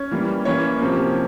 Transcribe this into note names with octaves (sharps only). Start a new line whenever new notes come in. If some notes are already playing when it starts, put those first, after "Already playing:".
Already playing: C#4 C#5
E3 G3 A#3
E3 A#3 C#4 C#5
C3 F3 A#3